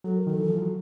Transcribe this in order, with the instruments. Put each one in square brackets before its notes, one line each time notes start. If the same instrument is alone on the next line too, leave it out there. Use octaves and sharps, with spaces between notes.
[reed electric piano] F#3 [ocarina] A4
[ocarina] A#4
[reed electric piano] D#3 [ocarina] A4
[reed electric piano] E3
F3
F#3